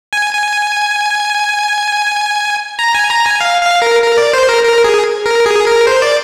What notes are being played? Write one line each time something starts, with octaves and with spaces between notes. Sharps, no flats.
G#5
G#5
A#5
G#5
A#5
G#5
F5
F5
A#4
A#4
D5
C5
A#4
A#4
G#4
A#4
G#4
A#4
C5
D5